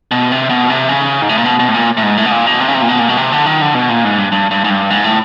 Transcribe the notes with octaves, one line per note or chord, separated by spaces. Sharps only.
B2
C3
B2
C3
C#3
G#2
A2
A#2
B2
B2
A2
A#2
A2
G#2
A2
B2
A#2
B2
C3
C#3
C3
A#2
B2
A#2
B2
C3
D3
D#3
D3
B2
A#2
G#2
G2
G2
G2
G#2
G2
G#2
A2